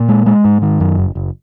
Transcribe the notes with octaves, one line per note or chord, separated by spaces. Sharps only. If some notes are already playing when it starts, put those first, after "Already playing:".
Already playing: A#2
G#3
G#3
G#2
D#3
F#2
F#1
F#1